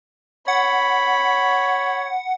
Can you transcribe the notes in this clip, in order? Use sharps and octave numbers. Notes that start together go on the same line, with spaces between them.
C#5 F#5 B5